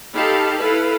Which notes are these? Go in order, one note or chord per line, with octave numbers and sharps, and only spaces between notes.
D#4 G4 A4 F5 A5 B5
E4 A4 B4 F5